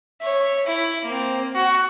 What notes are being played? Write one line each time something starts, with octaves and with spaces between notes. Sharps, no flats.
C#5 E5
E4
A#3 C4
F#4